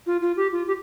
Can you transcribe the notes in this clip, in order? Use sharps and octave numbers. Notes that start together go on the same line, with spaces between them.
F4
F4
G4
F4
G4